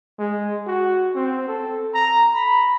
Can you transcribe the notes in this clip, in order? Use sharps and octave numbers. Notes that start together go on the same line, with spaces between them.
G#3
F#4
C4
A4
A#5
B5